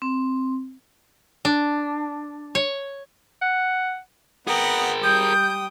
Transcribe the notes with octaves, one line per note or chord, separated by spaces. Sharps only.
C4
D4
C#5
F#5
B3 G#4 A#4 D#5 F#5 G5
G3 G5 D#6 G6